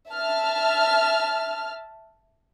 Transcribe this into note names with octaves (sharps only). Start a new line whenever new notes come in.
E5 A5 F6